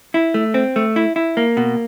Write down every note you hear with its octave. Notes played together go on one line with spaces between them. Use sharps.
E4
A3
C4
A3
E4
E4
A#3
B2